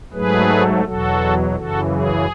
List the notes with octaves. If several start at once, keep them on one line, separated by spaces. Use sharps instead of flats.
G#2 F#3 A3 G#4 B4
E2 B2 F#3 F#4 A4
F#2 C#3 E3 F#4 A4
G#4